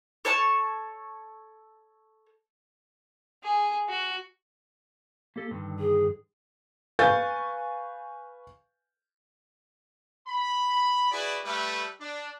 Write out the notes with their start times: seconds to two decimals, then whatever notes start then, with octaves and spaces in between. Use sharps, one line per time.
0.25 A4 C#5 A5 C#6
3.43 G#4
3.89 F#4
5.36 A#3 G4 A4
5.51 G2 D3 D#3
5.79 G#4
6.99 B4 F5 G#5 C#6 G6 A6
10.28 B5
11.12 E4 F#4 G#4 B4 D5
11.44 G3 A3 B4
12.00 D4